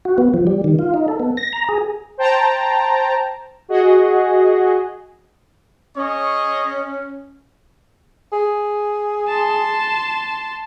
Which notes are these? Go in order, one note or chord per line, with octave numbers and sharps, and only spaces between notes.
F#4
B3
F3
G3
D#3
F4
D#4
A4
B3
A#6
A#5
G#4
C5 G5 A5 A#5
F#4 G#4 D#5
C#4 G#4 C#5 D#5
G#4
A5 C6